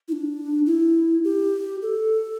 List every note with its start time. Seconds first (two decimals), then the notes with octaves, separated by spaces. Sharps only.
0.08 E4
0.12 D4
0.66 E4
1.24 G4
1.82 A4